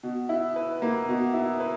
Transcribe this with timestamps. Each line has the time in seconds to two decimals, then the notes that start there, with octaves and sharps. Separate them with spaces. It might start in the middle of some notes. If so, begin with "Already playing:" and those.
0.03 B2
0.29 E4
0.56 B4
0.82 A#3
1.09 B2
1.34 E4
1.60 B4